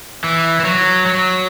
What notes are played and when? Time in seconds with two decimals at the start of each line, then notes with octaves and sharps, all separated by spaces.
0.24 E3
0.60 E3
0.65 F#3
1.06 F#3